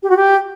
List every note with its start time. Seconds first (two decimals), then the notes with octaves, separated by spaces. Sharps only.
0.03 G4
0.09 F#4
0.16 G4